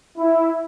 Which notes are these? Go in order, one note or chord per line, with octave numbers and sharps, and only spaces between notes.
E4